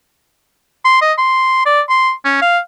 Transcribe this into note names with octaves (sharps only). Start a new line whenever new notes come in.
C6
D#5
C6
D5
C6
C#4
F5